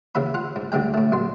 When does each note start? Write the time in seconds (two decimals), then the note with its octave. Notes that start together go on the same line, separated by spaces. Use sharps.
0.15 D#2 C#3 E3 E5 B5
0.34 F4 F#5
0.56 G#2
0.72 D2 G2 D3 G#3 G5
0.94 A2 A3
1.12 A#1 F#2 C6